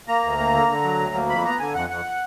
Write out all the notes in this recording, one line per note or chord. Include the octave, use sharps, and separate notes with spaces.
A#3 A#5
D2
A#3
D3
D3
F#3
D2
A#3
F2 B5
B3 A#5
D3 G#5
F2 F#5
F2 F#5